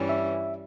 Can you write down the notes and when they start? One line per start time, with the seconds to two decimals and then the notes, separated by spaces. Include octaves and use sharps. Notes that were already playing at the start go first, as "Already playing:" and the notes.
Already playing: G2 E3 G3 C#4
0.09 E5